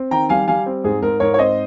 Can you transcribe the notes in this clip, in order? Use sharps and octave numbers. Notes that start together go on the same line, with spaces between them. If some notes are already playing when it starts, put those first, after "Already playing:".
Already playing: C4
D#3 G5 A#5
G3 F5 G#5
G3 F5 G#5
C4
G#2 G#4
G#2 A#4
G#2 A#4 C#5
C#5
C4 C5 D#5